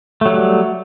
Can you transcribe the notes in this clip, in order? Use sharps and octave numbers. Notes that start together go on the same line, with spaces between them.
F#3 G3 A3